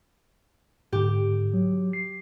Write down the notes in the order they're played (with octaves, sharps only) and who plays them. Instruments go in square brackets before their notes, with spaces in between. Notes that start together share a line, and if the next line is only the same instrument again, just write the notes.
[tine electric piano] G#2 D3 [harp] G4
[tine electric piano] F#3
C7